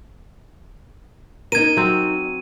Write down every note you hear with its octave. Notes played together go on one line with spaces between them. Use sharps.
D#4 A#4 G#6 D#7
F#3 C4